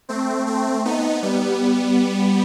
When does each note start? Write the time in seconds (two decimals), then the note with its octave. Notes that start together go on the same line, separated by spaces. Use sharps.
0.09 A3 C4
0.46 A3 C4
0.85 B3 D#4
1.23 G3 B3